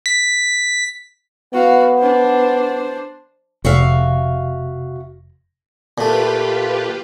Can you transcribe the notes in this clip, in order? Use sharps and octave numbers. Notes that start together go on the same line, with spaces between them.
B6
B3 F#4 F5
D4 C5
F1 C3 F#4 E5 F5
A#2 A3 F4 G4 B4